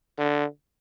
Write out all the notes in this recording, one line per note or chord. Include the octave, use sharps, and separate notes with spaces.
D3